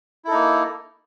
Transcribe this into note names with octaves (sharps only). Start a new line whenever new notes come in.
A#3 D#4 E4 A4